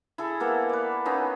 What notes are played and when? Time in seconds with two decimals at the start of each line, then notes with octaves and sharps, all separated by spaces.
0.18 E4 G#4 A4
0.40 A#3 B3 A4
0.69 B4 D5
1.05 B3 C#4 D#4 F4